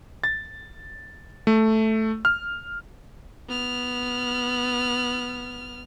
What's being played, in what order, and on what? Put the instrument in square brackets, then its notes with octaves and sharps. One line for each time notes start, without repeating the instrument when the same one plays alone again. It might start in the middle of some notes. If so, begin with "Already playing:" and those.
[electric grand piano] A6
A3
F6
[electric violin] B3 F6